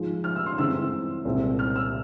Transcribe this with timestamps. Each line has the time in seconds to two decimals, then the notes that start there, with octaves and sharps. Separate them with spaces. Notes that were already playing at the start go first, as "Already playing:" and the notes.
Already playing: G#2 F3 G#3
0.24 F6
0.36 E6
0.46 C6
0.58 G2 E3 G#3 C4 E6
1.25 C2 A#2 G#3 C4
1.59 F6
1.76 E6